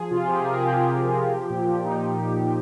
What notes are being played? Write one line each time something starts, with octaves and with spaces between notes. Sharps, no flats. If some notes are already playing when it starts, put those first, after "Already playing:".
Already playing: F3 G#4
C3 F4
F3 G4
G#4
C3 A#4
G#4
F3 G4
G#4
C3 G4
F3
C3
F3
A#2
F3
A#2 D#4
F3